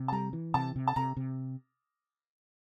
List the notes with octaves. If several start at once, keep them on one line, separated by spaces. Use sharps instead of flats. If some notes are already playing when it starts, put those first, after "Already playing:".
Already playing: C3
A5
G3 A#5
E3
C3 A5
C3
A5
C3 A#5
C3